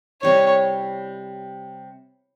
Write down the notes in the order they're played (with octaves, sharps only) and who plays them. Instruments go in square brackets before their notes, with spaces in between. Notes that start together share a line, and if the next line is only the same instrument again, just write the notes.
[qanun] C3 G3 C4 E4 [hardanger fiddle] C#5